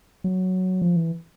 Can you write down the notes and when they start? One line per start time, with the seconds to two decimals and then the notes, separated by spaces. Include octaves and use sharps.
0.24 F#3
0.82 F3
0.96 E3